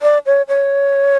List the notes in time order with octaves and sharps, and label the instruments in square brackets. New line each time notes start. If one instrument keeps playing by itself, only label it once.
[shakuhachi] D5
C#5
C#5